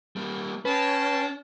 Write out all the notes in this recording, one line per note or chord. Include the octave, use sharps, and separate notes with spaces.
G3 A#3
G#3 C#4 B4 G5 A5